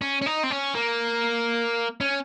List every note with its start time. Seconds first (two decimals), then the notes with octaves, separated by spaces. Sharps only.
0.01 C#4
0.22 C#4
0.26 D#4
0.44 C4
0.51 C#4
0.75 A#3
2.00 C#4